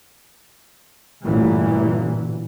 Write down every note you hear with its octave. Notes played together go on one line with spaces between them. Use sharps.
A1 D2 G2 A#2 E3